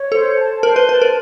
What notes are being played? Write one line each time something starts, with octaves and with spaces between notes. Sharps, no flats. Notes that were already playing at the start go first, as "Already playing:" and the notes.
Already playing: C#5
A4 C5
A5
A#4 C5
B4
B4 A5
A#4